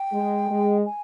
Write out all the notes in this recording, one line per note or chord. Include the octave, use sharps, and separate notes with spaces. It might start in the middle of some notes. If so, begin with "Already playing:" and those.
Already playing: G5
G#3
G#3
G#5